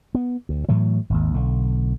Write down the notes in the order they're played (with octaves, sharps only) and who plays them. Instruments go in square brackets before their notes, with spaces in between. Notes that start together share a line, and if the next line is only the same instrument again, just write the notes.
[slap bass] B3
D2
A2 E3 F#3 A3
G#1 D#2
B1 D3